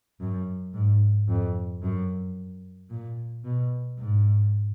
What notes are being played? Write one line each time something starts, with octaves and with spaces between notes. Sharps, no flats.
F#2
G#2
F2
F#2
A#2
B2
G#2